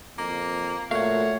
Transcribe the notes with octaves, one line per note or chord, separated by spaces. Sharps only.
F2 A#3
A#2 A3 F#4 C#5 F5